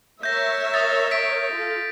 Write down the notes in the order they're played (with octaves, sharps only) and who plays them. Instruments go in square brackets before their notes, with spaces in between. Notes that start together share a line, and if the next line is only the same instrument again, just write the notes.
[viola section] A#4 C#5 E5 [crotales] G6 A#6
[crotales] D#6 A6
B6 D7
[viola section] F4 A4